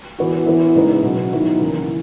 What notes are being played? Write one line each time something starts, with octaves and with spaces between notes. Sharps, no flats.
E3 B3 F#4
E3 B3 E4
C#3 G#3 B3 D#4
B2 F#3 C#4
D#3 F#3 B3 E4
C#3 E3 A#3